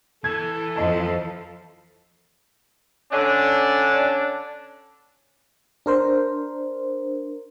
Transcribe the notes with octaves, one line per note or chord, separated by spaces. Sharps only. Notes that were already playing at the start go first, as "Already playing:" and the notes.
E3 A4 G#6
F2 F3 D#5 A5
D3 C#4 D4
D4 A#4 C5